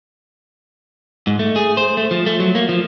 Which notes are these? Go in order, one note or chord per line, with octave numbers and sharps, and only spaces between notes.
G#2
A3
G#4
C5
A3
F3
A3
F#3
A#3
F3